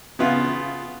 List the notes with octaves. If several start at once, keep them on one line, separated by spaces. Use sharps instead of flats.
C#3 B3 F4